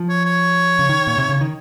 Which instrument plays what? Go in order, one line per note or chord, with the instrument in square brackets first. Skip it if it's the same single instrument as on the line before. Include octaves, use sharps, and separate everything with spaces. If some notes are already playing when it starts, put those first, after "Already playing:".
Already playing: [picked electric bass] F3
[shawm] C#5
C#5
[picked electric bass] C#3
D#3
A#2
C3
C#3
D#3